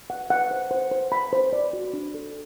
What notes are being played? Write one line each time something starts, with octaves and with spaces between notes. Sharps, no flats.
F#5
F#5
C5
C5
C5
B5
C5
D5
F#4
D4
A4